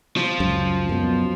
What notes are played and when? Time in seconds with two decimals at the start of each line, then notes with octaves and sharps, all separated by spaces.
0.17 F3
0.40 C#2 F#2
0.89 F#2 B2